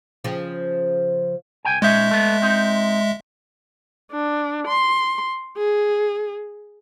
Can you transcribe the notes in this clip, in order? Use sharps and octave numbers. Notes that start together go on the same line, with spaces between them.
C#3 F3
C2 G5 G#5
A#2 G#3 C#4 D#4 E5
A3 B3
C4 D#4
D4
C6
G#4